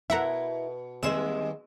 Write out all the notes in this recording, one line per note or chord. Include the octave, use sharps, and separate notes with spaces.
B2 E4 A#4 E5 F#5 A#5
D#2 G3 G#3 C4 G#4 E5 E7